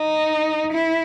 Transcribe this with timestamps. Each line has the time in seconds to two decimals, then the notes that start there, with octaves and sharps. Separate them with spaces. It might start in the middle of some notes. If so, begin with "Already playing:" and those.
Already playing: D#4
0.73 E4